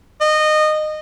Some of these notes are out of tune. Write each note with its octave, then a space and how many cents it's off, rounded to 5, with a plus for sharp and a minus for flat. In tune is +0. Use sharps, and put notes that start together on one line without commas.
D#5 -20